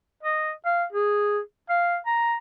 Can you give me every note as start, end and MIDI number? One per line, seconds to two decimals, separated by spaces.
0.23 0.51 75
0.65 0.84 77
0.92 1.39 68
1.69 1.97 77
2.06 2.36 82